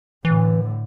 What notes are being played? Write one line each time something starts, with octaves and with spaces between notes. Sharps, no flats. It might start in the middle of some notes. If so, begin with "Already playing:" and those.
A2 D3 E3